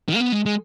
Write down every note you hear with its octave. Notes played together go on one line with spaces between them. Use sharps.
D#3
A#3
B3
G#3
G#3